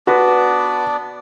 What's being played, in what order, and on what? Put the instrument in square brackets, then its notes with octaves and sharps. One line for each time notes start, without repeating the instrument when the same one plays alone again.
[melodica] B3 D4 D5 [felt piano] F#4 B4